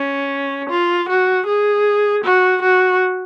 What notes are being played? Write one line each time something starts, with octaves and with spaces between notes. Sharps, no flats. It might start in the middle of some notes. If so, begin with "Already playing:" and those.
Already playing: C#4
F4
F#4
G#4
F#4
F#4